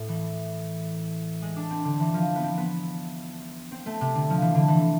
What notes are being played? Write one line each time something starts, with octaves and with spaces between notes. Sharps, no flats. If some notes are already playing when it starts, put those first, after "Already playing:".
Already playing: A2
E3
G#3
D4
C4
D3
E3
F3
B3
C4
B3
C4
A3
C3
D3
F3
E3
D3
E3